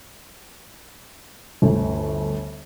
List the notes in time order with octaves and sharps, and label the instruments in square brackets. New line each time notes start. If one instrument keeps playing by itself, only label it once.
[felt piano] G1 D2